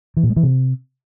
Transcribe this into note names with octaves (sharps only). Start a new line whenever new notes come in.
E3
A#2
G#3
E3
C3